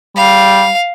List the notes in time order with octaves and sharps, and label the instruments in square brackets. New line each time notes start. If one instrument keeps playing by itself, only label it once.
[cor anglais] G3 [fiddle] F5